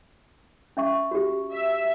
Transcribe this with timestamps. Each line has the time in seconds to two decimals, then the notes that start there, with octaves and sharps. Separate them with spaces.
0.77 C#4 E5 C#6
1.11 F#4 G4
1.52 E5